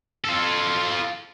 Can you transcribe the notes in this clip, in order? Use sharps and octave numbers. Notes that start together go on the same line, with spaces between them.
F4 A4